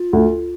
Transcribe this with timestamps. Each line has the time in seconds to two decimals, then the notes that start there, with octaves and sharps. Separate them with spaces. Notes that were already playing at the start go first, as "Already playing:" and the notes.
Already playing: F4
0.13 D2